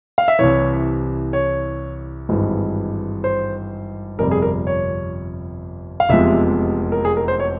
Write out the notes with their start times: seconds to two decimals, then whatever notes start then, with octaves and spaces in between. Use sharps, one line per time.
0.18 F5
0.28 E5
0.39 C2 C3 E3 C#5
1.33 C#5
2.29 G#1 G2 E3 G#3
3.24 C5
4.18 G1 F2 C3 G3 A#4
4.31 G#4
4.42 A#4
4.67 C#5
6.00 F5
6.09 F1 E2 C3 F3 G#3 E5
6.92 A#4
7.05 G#4
7.17 A#4
7.28 C5
7.40 C#5